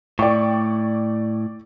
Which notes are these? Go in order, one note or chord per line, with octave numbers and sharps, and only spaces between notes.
A2 D5 G5 C#6